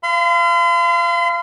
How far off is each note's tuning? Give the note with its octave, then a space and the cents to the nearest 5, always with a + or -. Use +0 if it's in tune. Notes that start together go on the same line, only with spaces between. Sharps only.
F5 -30 C6 -45